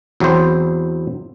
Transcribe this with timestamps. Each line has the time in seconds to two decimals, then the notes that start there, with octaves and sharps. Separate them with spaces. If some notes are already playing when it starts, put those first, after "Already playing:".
0.20 E2 F#3 C4 E4 C5